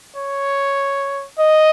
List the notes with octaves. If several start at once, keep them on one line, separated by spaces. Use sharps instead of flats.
C#5
D#5